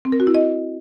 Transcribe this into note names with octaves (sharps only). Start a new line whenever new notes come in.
C4
A#4
F#4
E4
D#5